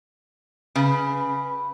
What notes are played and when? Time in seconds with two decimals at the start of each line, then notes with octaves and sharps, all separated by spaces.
0.76 C#3 B4 B5